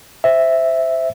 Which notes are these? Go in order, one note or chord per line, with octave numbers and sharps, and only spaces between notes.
C5 E5